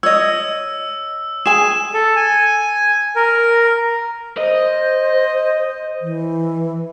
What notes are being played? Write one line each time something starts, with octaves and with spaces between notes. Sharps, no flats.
C#5 D#5 E6
G#4 G#5 E7
A4
G#5
A#4
C5 D#5
E3